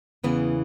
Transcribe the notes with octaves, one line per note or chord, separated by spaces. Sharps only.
E2 C#3 E3 B3